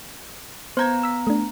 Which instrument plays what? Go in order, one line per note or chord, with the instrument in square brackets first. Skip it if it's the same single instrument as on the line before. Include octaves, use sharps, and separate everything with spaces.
[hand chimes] B3 A#5 [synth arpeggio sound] C5 G6 G#6
[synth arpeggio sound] E6 B6
A3 D4